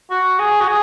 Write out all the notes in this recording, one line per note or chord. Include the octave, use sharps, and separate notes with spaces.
F#4
G#4
F#4
G#4